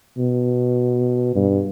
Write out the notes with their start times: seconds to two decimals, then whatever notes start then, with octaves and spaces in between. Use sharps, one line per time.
0.18 B2
1.35 G2